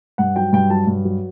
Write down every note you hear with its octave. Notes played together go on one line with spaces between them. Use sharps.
G2 F#5
F#3 G5
G2 G5
F#3 A5
G2
F#3